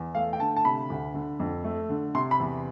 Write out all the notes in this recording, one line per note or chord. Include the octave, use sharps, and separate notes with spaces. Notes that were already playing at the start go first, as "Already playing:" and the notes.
Already playing: E2
A3 F5
G5
D3 A5
A5
C3 B5
D2
D3
F2
A3
D3
C3 C6
B5
E2